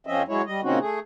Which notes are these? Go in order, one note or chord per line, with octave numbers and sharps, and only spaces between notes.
F2 F3 C4 C#4 D#5 E5
F#3 G#3 E4 C#5
G3 D#5
A#2 C#3 C4 C#4 D#4 F#4
A3 G#4